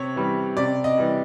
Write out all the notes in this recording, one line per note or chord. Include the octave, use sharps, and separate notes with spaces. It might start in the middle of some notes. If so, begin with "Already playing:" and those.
Already playing: C3 C#5
E3 G3
C3 D5
D#5
E3 G3